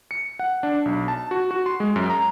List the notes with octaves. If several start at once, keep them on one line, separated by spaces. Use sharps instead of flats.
C#7
F#5
D4
B1
A5
F#4
F#4
C6
G#3
F#2
A#5